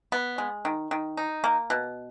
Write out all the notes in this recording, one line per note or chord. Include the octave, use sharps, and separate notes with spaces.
B3
G#3
D#3
D#3
D#4
A#3
B2